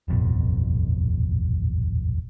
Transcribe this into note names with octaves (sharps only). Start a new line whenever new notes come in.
D#1 A1 F2 B2